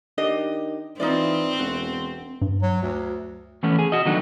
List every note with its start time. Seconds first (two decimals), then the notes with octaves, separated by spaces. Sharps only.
0.18 D#3 D4 G4 D#5
1.00 E3 C4 D#4 F4 D5
1.59 E1 F#4
2.42 G2
2.63 F#3
2.82 D2
3.63 E3 A3 B3 C#4
3.79 G#4
3.92 F#4 D#5
4.05 D#3 F#3 A3 B3 D4 D#4